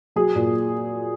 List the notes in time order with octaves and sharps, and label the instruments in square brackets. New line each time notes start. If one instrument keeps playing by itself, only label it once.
[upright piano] F#3 G#4
A#2